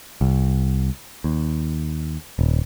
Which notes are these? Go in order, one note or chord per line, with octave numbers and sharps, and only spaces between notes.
C2
D#2
D#1